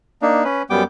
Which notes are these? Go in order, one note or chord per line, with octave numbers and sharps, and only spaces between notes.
A#3 D4 D#4
C#4 B4
F#2 G3 B3 G5 D6